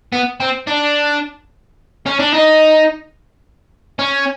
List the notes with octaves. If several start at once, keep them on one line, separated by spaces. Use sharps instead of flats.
B3
C4
D4
C#4
D4
D#4
C#4